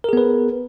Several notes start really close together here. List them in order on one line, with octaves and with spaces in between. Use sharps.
A#4 G#4 B3 B4